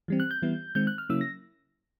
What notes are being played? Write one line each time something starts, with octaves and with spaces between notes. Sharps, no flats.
E3 G3 C4
F#6
G6
E3 G3 B3 E4
D#3 G#3 C4 G6
F#6
F6
C#3 F#3 A#3 C#4 E4 E6
A#6